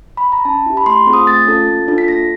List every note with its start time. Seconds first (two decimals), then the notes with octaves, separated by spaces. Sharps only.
0.17 B5
0.32 A#5
0.45 C#4 A5
0.66 E4 G4
0.77 B5
0.86 A3 C6
1.07 C4 F4 G#4
1.13 D#6
1.26 A3 A6
1.47 C#4 F4 A4
1.67 A#3
1.88 D4 F4 A4
1.98 B6
2.08 A#3 A#6